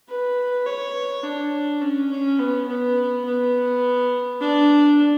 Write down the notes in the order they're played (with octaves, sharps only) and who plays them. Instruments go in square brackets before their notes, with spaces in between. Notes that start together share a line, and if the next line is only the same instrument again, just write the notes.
[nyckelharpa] B4
C#5
D4
C#4
C#4
B3
B3
B3
D4